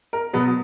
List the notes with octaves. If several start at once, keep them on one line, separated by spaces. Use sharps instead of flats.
A#4
B2 F#3 B3